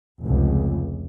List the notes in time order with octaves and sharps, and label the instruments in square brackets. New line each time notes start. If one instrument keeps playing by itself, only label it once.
[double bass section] F1 C#2